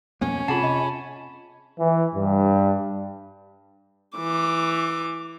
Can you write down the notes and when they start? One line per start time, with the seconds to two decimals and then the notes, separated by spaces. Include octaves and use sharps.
0.21 F2 B2 A#3 C#4
0.48 C3 F4 G#4 F#5 A5 B5
0.63 D#5
1.79 E3
2.14 G2
4.17 E3 D6